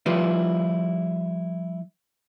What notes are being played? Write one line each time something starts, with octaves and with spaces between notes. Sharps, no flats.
F3 G3 E4 F4 G4 B4